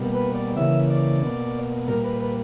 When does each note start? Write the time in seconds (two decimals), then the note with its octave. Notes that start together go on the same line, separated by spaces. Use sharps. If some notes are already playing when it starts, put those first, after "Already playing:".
Already playing: B2 G3 A#3
0.14 B4
0.35 D5
0.56 C#3 E3 A#3 E5
0.90 D5
1.22 B2 A#3
1.88 A#2 G3 A#3 A#4
2.04 B4
2.20 B4